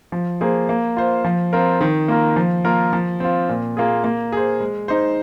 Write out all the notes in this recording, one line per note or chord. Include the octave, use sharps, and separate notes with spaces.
F3
A#3 G#4 C5
A#3
F4 C5
F3
C4 F4 A#4
D#3
A#3 F4 A#4
F3
A#3 F4 A#4
F3
C4 F4
A#2
A#3 F4 G#4
A#3
G#4 C5
G#3
D#4 C5